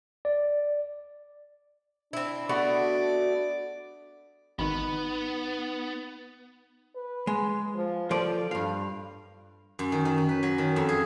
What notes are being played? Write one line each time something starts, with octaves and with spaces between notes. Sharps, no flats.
D5
C4 D4 E4
A3 B3 F#4 D5
G#1 D#3 B3 D#4 B5
B4
G#3
F3
F3 F4 A4 D5
G2 F5
F#2
D#3
D#3
C#4
B4
F#3
D#3
F2
G#4